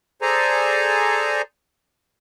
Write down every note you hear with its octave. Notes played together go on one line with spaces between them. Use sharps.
G#4 A4 C5 D5 G#5 A#5